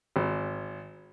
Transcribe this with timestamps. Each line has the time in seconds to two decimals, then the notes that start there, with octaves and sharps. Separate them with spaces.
0.16 G#1